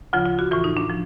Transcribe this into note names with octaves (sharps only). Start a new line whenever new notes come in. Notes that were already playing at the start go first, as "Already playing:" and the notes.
D2 C#3 F3 F4
F4
F#4
A2 E3 F4
D#4
D4
F3